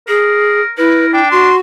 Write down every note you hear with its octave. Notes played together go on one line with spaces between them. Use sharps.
G#4 A#4
E4 A#4 B4
D4 G5
F#4 C6